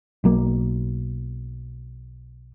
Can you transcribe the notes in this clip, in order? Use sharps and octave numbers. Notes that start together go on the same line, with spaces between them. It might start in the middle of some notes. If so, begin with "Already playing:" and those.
B1 F#3 A#3